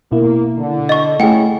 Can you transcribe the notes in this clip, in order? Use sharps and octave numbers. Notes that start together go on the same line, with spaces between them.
B2 A#3 E4
D3
D#5 C#6
A2 C#3 A3 E4 G#4 F#5 G5